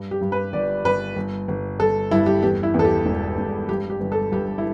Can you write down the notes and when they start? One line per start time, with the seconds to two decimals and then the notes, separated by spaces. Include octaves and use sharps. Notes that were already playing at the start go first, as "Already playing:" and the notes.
Already playing: G2
0.11 G4
0.21 G2
0.32 B4
0.53 G1 D5
0.84 G1 B4
1.16 G1
1.48 G1
1.79 G1 A4
2.11 G2 E4
2.26 G4
2.43 E2 G4
2.63 E4
2.74 E2
2.79 A4
2.84 G4
3.05 E1
3.38 E1
3.69 G2 G4
3.90 G4
4.00 G1
4.12 A4
4.32 G2 G4
4.58 E4